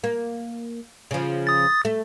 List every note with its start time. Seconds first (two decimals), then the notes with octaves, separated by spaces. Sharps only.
0.04 A#3
1.11 C#3 F3
1.47 D#6 A6
1.85 A3